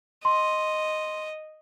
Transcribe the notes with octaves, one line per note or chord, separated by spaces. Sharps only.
D#5 C6